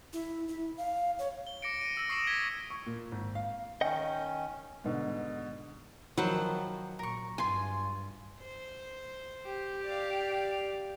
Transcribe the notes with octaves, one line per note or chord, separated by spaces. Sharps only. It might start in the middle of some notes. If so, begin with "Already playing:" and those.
E4
E4
F5
C#5
G7
D6 A#6 C#7 D7
D#7
E6 A#6
C#6 D#6 C7 D7 E7 F#7
G#6 B6 G7
C#6
A#2
G#1
F5
D#3 C#4 D#5 F#5 G5
G#2 B2 D3
D#3 F3 F#3 C5 F#5 B5
A#2 A#4 C#6
G2 F4 G#5 C6
C5
G4
D5 F5